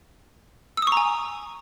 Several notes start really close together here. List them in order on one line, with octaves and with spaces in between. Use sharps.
E6 D#6 C#6 A#5 G#5